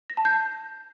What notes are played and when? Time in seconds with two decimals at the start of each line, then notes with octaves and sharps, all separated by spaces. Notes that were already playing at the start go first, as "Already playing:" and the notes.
0.10 A#6
0.17 A5
0.25 G6